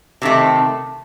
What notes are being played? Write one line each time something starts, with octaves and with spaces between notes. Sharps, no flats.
C3 D#3 A3 C4